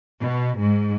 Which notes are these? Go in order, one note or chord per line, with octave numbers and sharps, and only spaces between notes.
B2
G#2